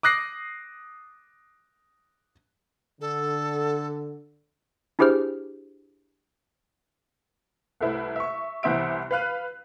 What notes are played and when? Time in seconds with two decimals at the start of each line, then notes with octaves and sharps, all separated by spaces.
0.03 D6 D#6 F#6 A#6 C7
3.01 D3 A4
4.99 D4 E4 G4 G#4 C5 F6
7.81 C2 A3 E4 B4
8.16 E5 C#6
8.63 C2 E3 B3 C5 E5 D7
9.11 B4 F5 F#6 D#7